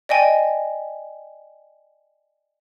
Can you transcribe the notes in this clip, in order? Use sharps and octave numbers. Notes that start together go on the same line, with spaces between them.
D5 D#5 G5 G#5